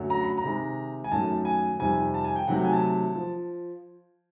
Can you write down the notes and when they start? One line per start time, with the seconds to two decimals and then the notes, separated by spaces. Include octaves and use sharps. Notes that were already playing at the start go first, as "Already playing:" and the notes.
Already playing: F#2 D3 F#3 A3
0.10 A#5
0.23 B5
0.38 A#5
0.44 C3 D#3 G#3
1.04 G#5
1.11 F#2 D#3 F#3 A3 A5
1.45 G#5
1.79 F2 C3 D#3 G3 G#5
2.14 A5
2.24 G#5
2.36 G5
2.47 C3 D#3 F#3 A3 F#5
2.56 G5
2.65 G#5
2.73 A5
3.15 F3